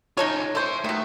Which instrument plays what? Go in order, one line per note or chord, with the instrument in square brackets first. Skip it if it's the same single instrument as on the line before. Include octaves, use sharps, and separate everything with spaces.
[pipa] D#4 A4 C#5 [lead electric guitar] F4 G#4
[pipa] E3 C5 [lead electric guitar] A4 C#5
[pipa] B2 D#3 [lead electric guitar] A3